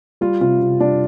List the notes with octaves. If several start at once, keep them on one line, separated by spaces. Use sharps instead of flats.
G3 F4
C3 F4
C3
G3 D4